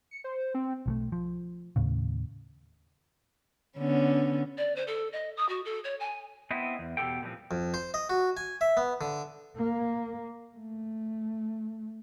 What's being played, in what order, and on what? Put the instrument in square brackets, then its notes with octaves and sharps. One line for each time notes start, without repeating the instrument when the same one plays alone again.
[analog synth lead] C#7
C5
C4
[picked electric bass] B1 F3 A3
F3
D#2 A2 C#3
[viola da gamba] D3 B3 C#4
[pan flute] D5
C5
A4
D#5
D#6
F#4
A4
C#5
G#5
[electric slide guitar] B3 C4 E4 D#5
E2
E2 B2 D4 G4 A4 G5
A#2 D3 E3 F3 G3 C4
[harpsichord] F2
C5
D#5
F#4
G#5
E5
B3
D3
[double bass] A#3
A3